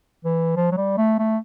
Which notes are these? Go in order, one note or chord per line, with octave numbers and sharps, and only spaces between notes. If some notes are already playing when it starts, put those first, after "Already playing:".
E3
F3
F#3
G3
A3
A3